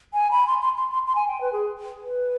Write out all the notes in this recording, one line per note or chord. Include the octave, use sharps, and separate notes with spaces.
G#5
B5
C6
C6
C6
C6
C6
G#5
G5
B4
G#4
B4